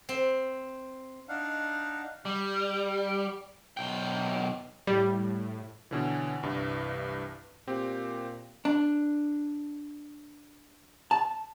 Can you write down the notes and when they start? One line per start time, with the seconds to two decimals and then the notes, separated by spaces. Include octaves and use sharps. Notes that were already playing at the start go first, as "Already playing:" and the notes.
0.09 C4
1.29 D4 D#4 F5 F#5
2.25 G3
3.77 B1 G5
4.87 A2 G3
5.91 B2 D3 E3 C#4
6.43 C2 G2 E3
7.67 A#2 C4 G4
8.65 D4
11.11 A5